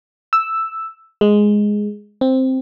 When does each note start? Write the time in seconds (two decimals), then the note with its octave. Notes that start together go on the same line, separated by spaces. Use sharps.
0.33 E6
1.21 G#3
2.21 C4